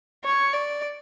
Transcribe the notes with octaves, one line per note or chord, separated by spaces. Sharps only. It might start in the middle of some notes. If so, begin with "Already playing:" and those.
C#5
D5